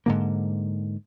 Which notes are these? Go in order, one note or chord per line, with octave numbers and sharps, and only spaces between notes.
G#2 D3 A#3